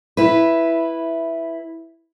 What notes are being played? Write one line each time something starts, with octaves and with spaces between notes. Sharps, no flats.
E4 B4